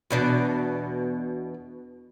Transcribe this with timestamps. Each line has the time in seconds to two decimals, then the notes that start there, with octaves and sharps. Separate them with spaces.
0.10 E2 B2 D4